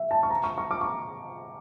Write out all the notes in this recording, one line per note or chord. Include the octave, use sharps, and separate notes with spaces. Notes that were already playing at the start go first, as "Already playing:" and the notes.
Already playing: E5
A5
C#6
A#5
C#6
C#6
D6
C#6